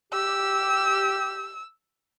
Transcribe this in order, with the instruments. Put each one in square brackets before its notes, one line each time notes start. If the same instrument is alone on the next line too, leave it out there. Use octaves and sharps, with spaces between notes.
[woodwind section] G4 [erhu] E6